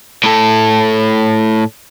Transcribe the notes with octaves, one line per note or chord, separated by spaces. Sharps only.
A2 A4